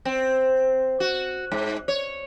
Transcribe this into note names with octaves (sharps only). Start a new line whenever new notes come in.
C4
F#4
G#2
C#5